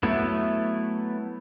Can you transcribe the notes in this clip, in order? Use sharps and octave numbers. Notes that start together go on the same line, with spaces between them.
F#3 A3 B3 E4